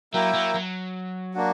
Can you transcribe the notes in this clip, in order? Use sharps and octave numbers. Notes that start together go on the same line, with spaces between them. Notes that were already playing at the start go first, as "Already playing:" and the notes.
F#3 A#3 E4 A#4 E5 G5
F#3
F#3
A#3 D4 F#4